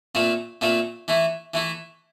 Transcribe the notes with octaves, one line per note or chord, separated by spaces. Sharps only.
A#2 A3 C4 F4
A#2 A3 C4 F4
E3 A3 E4
E3 A3 E4